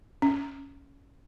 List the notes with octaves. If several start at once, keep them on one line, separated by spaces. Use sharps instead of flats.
C#4